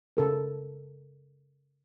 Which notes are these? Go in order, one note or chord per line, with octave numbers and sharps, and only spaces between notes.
C#3 A4 A#4